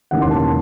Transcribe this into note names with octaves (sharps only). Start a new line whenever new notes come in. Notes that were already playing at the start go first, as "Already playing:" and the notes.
E1 D#2 C#3 E3 F#5
C6
A5